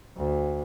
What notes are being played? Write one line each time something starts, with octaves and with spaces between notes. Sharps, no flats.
D2